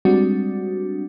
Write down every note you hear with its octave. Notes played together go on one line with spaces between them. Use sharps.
G3 G#3 C4 D4 F#4